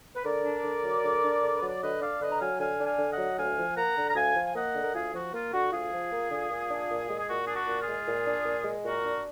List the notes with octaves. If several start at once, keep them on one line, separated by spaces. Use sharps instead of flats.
B4
D3 A#4 D5
D4
D3
F#3
D3
D4
D3
B4
F#3
D5
D3 B4 D#5
D4 D5 F5
D3 B4 D#5
A#5
F#3 F5 G#5
D3 F5 G#5
D4
F5 G#5
D3
D#5 F#5
F#3
D2 F5 G#5
F3
A#3 F#5 A#5
D3
A#5
D2 F5 G#5
F3
G#5
A#3 D#5 F#5
D3
A#4
D2 F4 G#4
F3 F#4
A#3 F4
D3 F#4
D2 F4 G#4
F3
A#3
D3
A#2
D4
A#2
G#3
G#4
A#2 F#4
D4 G#4
F#4
A#2
F4 G#4
G#3
A#2
D4
A#2
G#3
A#2 F#4 A#4
D4